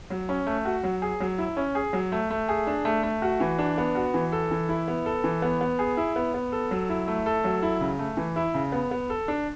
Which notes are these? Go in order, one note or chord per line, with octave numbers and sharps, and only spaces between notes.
F#3
C#4
A3
F#4
F#3
G#4
F#3
E4
C#4
G#4
F#3
A3
A3
G#4
D4
A3
A3
F#4
E3
D4
B3
F#4
E3
A4
E3
E4
B3
A4
E3
B3
B3
G#4
E4
B3
B3
A4
F#3
E4
A3
A4
F#3
E4
C#3
A3
E3
E4
C#3
B3
B3
A4
D4